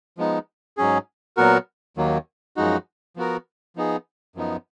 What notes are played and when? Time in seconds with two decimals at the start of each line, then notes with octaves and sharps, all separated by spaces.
0.17 F3 G#3 B3 D#4
0.77 G#2 F#3 C#4 G#4
1.37 A#2 F#3 B3 F#4 A#4
1.97 D#2 D#3 F#3 A#3
2.57 F#2 F3 G#3 D#4 F#4
3.16 F3 B3 F#4 A#4
3.76 F3 B3 D#4 G#4
4.35 F#2 F3 B3 D#4